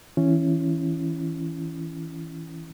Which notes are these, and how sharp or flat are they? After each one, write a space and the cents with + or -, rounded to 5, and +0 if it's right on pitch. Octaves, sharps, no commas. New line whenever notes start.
E3 -30 C#4 +0 E4 +25